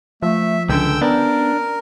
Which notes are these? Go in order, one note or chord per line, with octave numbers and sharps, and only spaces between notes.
F3 A3 E5
C#2 D3 C#4 G5 E6
B3 D4 A#4